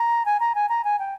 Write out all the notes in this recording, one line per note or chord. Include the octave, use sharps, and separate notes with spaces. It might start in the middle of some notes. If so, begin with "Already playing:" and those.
Already playing: A#5
G#5
A#5
G#5
A#5
G#5
G5